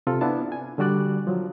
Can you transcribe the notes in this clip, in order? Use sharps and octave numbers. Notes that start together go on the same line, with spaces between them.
C3 C4 F4 A4
B3 D4 E4 A5
G#5
D3 G3 F#4 D5 F#6
F3 F#3